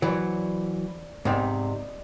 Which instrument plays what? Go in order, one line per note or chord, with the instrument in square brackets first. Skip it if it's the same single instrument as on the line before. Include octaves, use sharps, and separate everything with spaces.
[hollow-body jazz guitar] E3 F#3 [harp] C5 D5 C#6
[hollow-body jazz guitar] G#2 C3 [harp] B3 D#4 D5